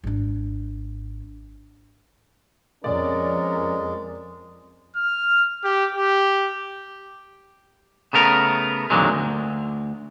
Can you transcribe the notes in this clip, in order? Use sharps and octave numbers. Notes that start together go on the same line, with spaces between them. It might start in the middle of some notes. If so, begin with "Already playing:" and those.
G#1 D4
F2 G#3 C#4 A#4 D5
F6
G4
G4
C#3 A3 B3 A#4
F2 A#2 D3 D#3 F#3 G#3
D2